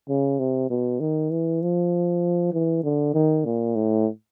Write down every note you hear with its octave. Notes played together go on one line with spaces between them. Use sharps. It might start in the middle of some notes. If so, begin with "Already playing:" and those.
C#3
C3
B2
D#3
E3
F3
E3
D3
D#3
A#2
A2